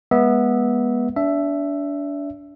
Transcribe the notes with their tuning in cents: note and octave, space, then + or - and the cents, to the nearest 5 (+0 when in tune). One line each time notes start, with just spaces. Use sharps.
G#3 -5 B3 -20 E5 -20
D4 -30 E5 +10